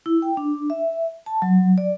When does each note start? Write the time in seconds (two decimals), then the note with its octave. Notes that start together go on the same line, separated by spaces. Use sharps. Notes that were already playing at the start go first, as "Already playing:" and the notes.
0.06 E4
0.22 G5
0.37 D4
0.70 E5
1.26 A5
1.42 F#3
1.78 D5